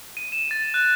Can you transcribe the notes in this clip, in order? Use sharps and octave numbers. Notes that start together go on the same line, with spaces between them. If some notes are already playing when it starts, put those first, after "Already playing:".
D#7
E7
A6
F#6